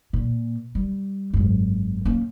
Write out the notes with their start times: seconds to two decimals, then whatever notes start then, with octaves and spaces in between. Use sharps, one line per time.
0.13 A#2
0.75 G3
1.33 G#1 F#2
2.05 A#3 C#4